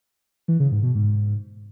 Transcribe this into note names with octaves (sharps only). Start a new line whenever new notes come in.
E3
C#3
G#2
B2
G#2